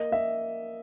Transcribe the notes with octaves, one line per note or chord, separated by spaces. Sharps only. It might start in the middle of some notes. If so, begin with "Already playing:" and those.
Already playing: A#3 D#5
A#3 E5